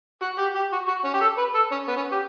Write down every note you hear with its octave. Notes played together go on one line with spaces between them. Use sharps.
F#4
G4
G4
F#4
F#4
C#4
G4
A4
B4
A4
C#4
B3
C#4
G4